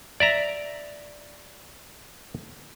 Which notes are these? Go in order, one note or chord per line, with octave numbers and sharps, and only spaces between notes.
D5 E5 A#5